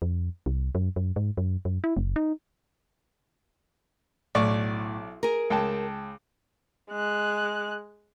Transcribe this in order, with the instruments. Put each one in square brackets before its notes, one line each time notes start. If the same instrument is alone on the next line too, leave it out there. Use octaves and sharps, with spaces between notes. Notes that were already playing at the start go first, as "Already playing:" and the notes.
[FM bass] F2
C2
F#2
F#2
G#2
F#2
F#2
E4
F#1
D#4
[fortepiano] B1 D5 C#6 [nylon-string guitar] A2
[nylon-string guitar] G#4 A#4
[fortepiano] C#2 G5 A5
[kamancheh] G#3 F#6